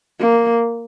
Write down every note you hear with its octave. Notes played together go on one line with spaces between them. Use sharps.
A#3